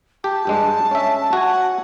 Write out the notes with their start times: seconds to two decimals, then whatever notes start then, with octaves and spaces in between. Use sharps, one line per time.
0.24 G4 A5
0.47 G2 G#3 D4
0.91 C#4 E5
1.33 F#4 G#5
1.46 F#5